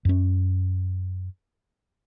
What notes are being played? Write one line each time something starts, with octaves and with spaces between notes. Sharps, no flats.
F#2 C#4